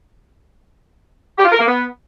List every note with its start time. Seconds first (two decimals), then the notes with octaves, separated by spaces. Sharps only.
1.38 G4
1.45 F4
1.52 A#4
1.59 A#3
1.66 B3